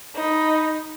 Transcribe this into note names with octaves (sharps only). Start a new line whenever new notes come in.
D#4 B5